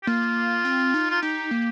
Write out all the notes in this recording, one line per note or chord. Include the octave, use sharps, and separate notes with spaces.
G4
A#3 F4
C4
D#4
F4
D#4 G4
A#3